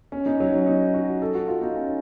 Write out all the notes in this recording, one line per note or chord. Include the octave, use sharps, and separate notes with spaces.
C#4
D#4
F#3
C#4
D#4
F#4
A4
F#4
F4
D#4
C#4